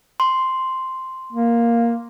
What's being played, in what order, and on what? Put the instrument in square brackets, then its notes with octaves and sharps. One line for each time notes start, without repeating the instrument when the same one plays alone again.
[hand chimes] C6
[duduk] A#3